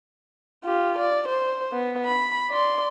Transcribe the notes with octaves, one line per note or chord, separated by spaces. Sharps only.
F4 G4
D5
C5
B3
B5
D5 C6